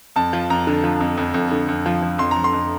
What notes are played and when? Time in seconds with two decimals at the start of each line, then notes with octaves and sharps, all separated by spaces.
0.16 F2 A5
0.33 F3
0.50 F2 A#5
0.67 D3
0.84 F3
1.01 F2
1.17 F2
1.34 F2
1.51 D3
1.68 F2
1.86 F3
2.02 F3
2.18 F2 C6
2.31 F2 A#5
2.44 C6
2.53 F2